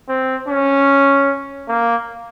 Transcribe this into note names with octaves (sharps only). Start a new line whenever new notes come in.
C4
C#4
A#3